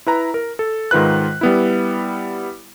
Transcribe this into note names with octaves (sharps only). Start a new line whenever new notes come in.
E4 B4 A#5
A#4
A4
G#2 D#3 F4 B4 F#6
G3 B3 E4